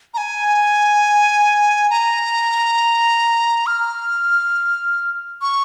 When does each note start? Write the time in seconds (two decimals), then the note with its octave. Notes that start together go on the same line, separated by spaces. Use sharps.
0.14 A#5
0.17 G#5
1.90 A#5
3.67 F6
5.42 C#6